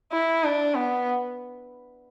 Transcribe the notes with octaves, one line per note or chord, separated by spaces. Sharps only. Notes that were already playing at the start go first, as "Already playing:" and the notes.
E4
D4
B3